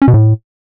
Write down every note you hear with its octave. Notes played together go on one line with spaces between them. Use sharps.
C#4
B2
A2